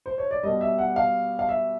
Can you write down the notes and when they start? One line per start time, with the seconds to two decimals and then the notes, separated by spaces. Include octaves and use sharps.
0.06 C5
0.18 C#5
0.31 D5
0.43 B2 G3 D#5
0.61 E5
0.78 F#5
0.96 F5
1.39 F5
1.49 E5